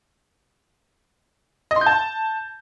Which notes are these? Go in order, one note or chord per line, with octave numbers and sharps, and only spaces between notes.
D#5
C6
G6
A5